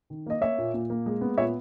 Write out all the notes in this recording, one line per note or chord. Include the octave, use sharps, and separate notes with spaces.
D#3
A#3 D#5
A#3 C#5 E5
A#2
A#2
A#3
G#3
B3
A#2 C#5 E5